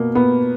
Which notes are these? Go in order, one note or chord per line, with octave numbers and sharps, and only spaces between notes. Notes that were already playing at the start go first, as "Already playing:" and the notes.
Already playing: B2 A#3
B3